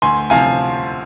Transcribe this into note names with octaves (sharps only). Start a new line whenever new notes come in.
D2 G#5 C6
C3 F3 F5 G#5